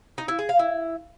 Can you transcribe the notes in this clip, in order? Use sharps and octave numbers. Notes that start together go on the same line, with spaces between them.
D#4
E4
G#4
F5
E4